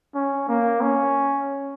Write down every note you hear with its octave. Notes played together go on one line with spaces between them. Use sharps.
C#4
A#3
C#4